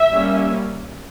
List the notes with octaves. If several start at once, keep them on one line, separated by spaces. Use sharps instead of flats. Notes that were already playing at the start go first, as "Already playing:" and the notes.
Already playing: E5
G3 A#3 C#4